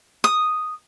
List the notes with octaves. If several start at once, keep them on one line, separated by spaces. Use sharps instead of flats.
D#6